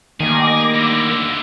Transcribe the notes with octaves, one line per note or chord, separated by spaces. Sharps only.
D#3 G3 A3 A#3 G#4 D6 A#6
D#2 D3